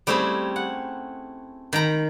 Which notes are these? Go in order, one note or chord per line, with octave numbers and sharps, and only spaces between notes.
G3 A3 C4 C#4 E4 G#4
F#5
D#3 G5 A#5 B5